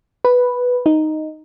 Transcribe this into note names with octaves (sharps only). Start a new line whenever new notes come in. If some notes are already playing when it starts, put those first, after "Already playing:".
B4
D#4